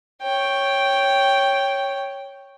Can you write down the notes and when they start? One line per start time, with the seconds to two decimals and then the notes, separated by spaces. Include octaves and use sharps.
0.23 C#5 G5